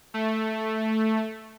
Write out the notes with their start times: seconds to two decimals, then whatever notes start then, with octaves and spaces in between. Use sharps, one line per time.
0.14 A3